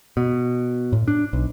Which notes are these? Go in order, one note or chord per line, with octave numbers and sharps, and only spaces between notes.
B2
A2
D4
B1